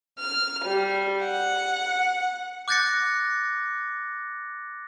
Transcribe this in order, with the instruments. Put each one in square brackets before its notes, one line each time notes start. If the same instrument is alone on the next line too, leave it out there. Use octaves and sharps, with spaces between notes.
[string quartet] F6
G3
F#5
[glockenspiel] D6 F#6 G6 A6 A#6 C#7